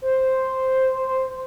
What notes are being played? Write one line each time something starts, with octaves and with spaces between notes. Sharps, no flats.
C5